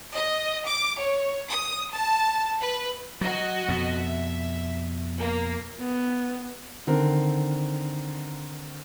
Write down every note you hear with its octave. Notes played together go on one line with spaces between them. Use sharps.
D#5
D6
C#5
D#6
A5
B4
F#3 F#4 D#5
F2 B2
E5
A#3
B3
D3 D#3 C4 A#4